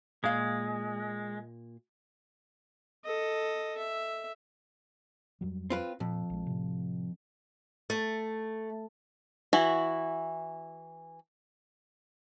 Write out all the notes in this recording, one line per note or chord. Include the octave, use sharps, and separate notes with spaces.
A#2 G#3 F5
A4 D#5
E5
F2 F#3 G3
C4 F4 B4
F2 A#2
A#1 G#3
A2 C3
A3
E3 E4 F#4